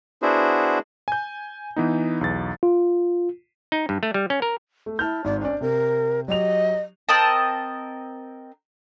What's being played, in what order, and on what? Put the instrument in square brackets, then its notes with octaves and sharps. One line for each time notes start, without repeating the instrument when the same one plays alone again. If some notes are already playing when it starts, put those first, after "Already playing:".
[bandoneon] B3 D4 E4 F#4 G#4 C5
[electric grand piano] G#5 G6
E3 B3 D#4
B1 E2 A6
[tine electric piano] F4
[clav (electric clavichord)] D#4
G2
A3
G3
C#4
A#4
[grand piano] A3
[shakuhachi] E4 [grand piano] A5 F6 G6
[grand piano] G#1 G#2 [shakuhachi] D5
[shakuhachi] C#4 [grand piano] D4 D5
[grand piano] C3 [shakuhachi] A#4
[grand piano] F#3 G4 F7 [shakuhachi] D#5
[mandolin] C4 A#4 D#5 A5